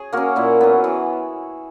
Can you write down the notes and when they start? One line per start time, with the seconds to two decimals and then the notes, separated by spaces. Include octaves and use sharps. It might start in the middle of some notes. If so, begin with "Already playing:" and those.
Already playing: G#4 C#5
0.13 A#3 C#4 F#4 A#4
0.36 A#2 E4
0.61 F#3 B3
0.84 E3